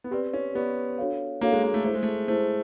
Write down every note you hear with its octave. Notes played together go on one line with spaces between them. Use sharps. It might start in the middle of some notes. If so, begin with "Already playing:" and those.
B3
C4 G4 B4 D5
C#4
B3 G4 B4 D5
D4 F#4 A4 C#5 F5
A#3 D4 F#4 A4 C#5 F5
G#3
A#3
A3
A3 E4 G#4 C5
G#3
A3
A3 E4 G#4 C5